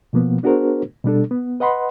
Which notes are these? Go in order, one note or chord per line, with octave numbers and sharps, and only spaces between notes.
B2 F3 A#3 B3
B3 D4 F#4 G#4 A#4 C5
B2 G3 D4 A4
B3
B4 D#5 F#5 B5 C6